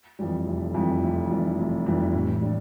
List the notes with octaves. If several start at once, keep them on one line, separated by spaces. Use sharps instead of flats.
F2 E3 G3
F1
F2 E3 G3
F1
F2 E3 G3
F1
F2 E3 G3
A2
G3 D4